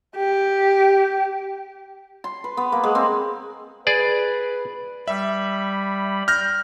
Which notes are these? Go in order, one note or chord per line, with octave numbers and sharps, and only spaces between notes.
G4
C6
B4
B3
A#3
G#3
C4
G#4 B4 D5
G3 E5 B5
F6 G6 A#6